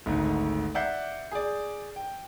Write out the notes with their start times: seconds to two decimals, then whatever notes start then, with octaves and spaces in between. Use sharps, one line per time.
0.06 G#1 D2 G#2 D3
0.75 D5 E5 F#5 G6 C7
1.32 G#4 D5
1.96 G5